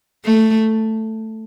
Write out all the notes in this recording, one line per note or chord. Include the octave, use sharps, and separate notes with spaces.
A3